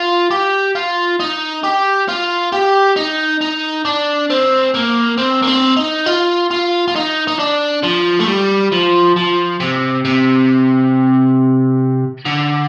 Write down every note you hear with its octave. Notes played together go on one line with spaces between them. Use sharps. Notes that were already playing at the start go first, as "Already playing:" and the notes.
Already playing: F4
G4
F4
D#4
G4
F4
G4
D#4
D#4
D4
C4
A#3
C4
A#3
C4
D#4
F4
F4
F4
D#4
D#4
D4
F3
A3
G3
F3
F3
C3
C3
D3